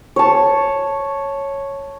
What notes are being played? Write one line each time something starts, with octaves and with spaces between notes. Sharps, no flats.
C#5 A5